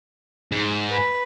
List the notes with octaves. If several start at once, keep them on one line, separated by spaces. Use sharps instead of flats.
G#2
B4